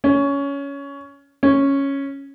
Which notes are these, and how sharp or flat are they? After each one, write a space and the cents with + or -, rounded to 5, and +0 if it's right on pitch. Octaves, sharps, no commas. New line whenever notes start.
C#4 +15
C#4 -5